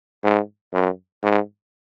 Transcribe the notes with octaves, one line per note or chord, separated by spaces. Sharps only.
G#2
F#2
G#2